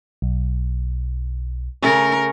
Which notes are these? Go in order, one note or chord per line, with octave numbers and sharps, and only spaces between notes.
B1
C#3 A3 C#4 A#4